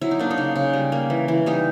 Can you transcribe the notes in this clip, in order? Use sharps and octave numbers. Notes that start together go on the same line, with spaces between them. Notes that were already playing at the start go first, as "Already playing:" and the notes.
F#3 E4
D#4
A#3 D4
D#4
C#3
C#3
G3
A#3
E3
E3
G3 D#4